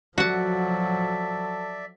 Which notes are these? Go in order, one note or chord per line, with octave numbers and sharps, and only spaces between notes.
F3 F#3 F#4 A4 D5 E5 F#5